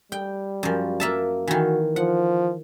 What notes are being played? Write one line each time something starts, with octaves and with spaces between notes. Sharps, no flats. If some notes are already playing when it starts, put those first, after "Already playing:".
G3 G5
F#2 F3
A#3 E5 A5
D#3 E3 F#4
F3 F#5